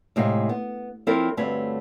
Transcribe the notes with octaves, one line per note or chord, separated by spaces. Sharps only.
A2 C3 G#3 D#4 B4 F5
B3
F3 C4 E4 F4 A#4 C#5
D2 G2 A3 C4 B4 C#5